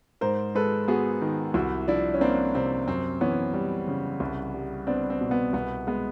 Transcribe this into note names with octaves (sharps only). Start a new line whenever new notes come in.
G#2 A#4 C5
G#3 A4 B4
B3 F#4 G#4
D#3
C2 E4 F#4
F3 D4 E4
C#4
A#3 C4 D4
C3 C4
F#2 C4
E3 B3 C#4
G3
C#3
C2
G3
B3 C4 D4
C4
B2
B3
C2 B3
G#3 B3